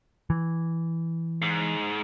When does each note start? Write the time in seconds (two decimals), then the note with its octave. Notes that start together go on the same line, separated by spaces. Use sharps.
0.30 E3
1.42 G#2